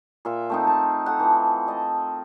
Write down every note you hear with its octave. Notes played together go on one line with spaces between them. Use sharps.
A#2 F4 E5 C#6
A3 C4 D#4
A5
A4 F#5
E3 F3
D#5 A5